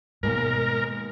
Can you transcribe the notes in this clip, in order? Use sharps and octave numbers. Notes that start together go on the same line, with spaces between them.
D#2 G#2 B2 G#3 A#4 B4